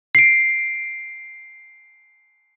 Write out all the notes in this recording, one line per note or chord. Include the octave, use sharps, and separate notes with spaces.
C7 D7